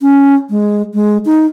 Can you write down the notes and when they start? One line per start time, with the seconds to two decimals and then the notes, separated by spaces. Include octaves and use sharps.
0.01 C#4
0.50 G#3
0.94 G#3
1.25 D#4